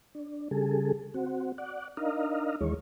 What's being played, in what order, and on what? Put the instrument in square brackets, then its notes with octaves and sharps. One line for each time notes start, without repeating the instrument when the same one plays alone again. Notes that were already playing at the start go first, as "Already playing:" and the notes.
[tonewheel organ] D4
C#3 G3 G#4 A4
C4 F#4
D5 F#5
D4 D#4 A#4 D#5 F5
D#2 E3 G#3 C#5